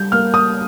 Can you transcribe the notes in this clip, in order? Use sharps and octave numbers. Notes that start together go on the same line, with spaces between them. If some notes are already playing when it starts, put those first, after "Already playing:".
Already playing: G3 G6
A#3 F6
D#6